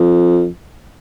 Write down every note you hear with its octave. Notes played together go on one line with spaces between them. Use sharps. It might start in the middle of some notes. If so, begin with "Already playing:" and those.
Already playing: F2